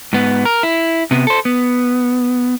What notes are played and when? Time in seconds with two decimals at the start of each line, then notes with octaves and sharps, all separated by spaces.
0.13 G#2 B3
0.45 A#4
0.63 E4
1.11 C3 B3
1.27 A4 C5
1.45 B3